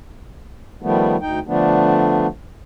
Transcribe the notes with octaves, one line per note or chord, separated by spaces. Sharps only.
D#3 F3 G3 A3 B3
D2 D#4 G5
D3 F3 A3 B3 D4